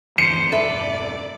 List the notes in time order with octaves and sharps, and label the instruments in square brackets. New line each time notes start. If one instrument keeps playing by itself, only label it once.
[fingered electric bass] D2 G2 E3 [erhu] C5 [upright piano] C#7
[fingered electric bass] E1 G2 [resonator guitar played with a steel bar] A4 B4 E5 [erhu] D5